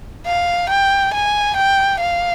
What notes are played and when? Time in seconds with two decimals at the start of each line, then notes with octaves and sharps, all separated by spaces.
0.27 F5
0.70 G5
1.14 G#5
1.57 G5
2.00 F5